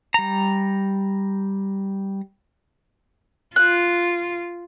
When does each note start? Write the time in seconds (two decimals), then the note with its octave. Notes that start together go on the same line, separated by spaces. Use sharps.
0.14 G3 A#5
3.56 F4 F#6